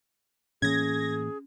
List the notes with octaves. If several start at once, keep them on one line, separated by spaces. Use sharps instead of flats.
A2 E3 A#3 C#4 G#4 G#6 A#6